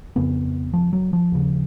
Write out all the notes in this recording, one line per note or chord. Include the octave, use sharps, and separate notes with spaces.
F2 C#3 B3
F3
F#3
F3
D#2 C#3